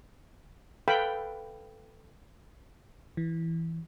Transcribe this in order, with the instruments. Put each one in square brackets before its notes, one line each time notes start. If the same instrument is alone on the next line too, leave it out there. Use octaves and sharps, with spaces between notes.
[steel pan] A4 B4 F5 G5 B5
[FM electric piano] E3